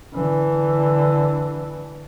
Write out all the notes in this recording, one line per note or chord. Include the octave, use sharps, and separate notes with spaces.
D3 E3